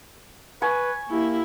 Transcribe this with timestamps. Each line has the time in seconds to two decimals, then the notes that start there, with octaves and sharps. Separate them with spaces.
0.62 B4 G#5 C#6
1.10 A#3 E4 G4